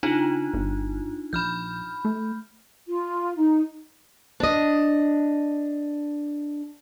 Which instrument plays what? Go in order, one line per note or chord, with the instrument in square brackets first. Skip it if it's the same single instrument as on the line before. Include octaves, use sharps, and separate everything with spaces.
[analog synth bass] C#3 [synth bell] D4 D#4 F4
[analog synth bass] G1
[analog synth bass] A#1 [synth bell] B5 F6 G6
[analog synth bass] A3
[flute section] F4
D#4
[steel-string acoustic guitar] D4 D#5